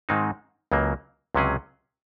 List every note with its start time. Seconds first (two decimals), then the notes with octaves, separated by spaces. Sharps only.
0.09 G#2 D#3 G#3 C4 D#4
0.72 C#2 C#3 F#3 A#3
1.35 C#2 C3 F#3 C#4 G#4